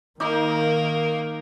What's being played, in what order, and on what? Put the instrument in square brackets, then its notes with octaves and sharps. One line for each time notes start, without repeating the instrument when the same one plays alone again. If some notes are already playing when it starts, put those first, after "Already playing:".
[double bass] D#3 [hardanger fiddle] A#3 [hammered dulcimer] D#4 D6